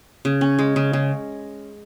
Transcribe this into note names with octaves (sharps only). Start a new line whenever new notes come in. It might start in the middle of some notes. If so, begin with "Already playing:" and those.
C#3
C#4
G#3
C#3
C#3